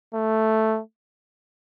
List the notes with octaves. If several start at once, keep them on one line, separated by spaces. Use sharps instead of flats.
A3